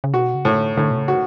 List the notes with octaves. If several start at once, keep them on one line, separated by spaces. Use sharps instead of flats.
C#3
B2 F#4
C#3
A2
D3
A2 D3
B2
C#3
F#4